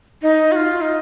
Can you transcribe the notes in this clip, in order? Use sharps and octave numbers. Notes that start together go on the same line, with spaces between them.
D#4
F#4
F4
D#4